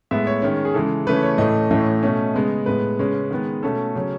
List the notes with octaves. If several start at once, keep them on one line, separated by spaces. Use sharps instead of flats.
A2 G#3 B3 E5
C#5
D#3 G#3 C#4
G#4
C#3 E3 G#3 A4
C#3 E3 A3 C#4 B4
C#5
A2 E3 A3 C#4 D#5
A2 E3 A3 C#4
B2 A3 C#4
C#3 G#3 B3
A2 G#3 B3 B4
C#3 G#3 C#4
D#3 G#3 B3
B2 A3 C#4 A4
C#3 F#3 C#4